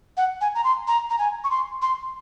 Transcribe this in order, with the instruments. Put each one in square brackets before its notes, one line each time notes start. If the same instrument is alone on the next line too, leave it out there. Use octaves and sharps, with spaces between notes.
[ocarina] F#5
G#5
A#5
C6
A#5
A#5
G#5
C#6
C6
C6